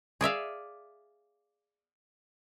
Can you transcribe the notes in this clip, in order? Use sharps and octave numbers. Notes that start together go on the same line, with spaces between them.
G#4 D5 E5 F5